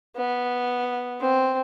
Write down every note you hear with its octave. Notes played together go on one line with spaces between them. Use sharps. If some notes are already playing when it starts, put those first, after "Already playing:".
B3
C4